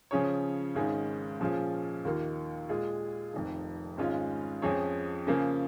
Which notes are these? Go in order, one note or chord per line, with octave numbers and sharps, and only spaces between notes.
C#3 F3 C#4 G#4 C#5
G#1 G#2 D#3 C#4 G#4
A#2 F3 C#4 F4 G#4
D#2 D#3 A#3 F4
A#2 G#3 F4 G#4
F1 F2 D#3
G#1 G#2 G#3 C#4 F4
F2 F3 C#4 G#4 C#5
C#3 F3 A#3 C#4